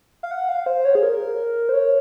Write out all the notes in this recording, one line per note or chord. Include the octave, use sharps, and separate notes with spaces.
F5
F#5
F5
C5
C#5
G#4
A#4
C5
C#5